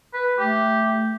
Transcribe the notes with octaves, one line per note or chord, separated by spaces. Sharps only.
B4
A3 G4